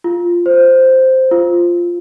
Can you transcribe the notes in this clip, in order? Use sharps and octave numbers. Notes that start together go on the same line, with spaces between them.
F4
C5
F4